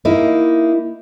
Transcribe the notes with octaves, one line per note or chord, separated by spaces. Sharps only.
A#3 D#4 E4